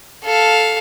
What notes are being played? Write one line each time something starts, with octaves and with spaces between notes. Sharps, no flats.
A4 F5